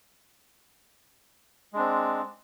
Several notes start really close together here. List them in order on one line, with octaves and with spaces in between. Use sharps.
G#3 D4 C4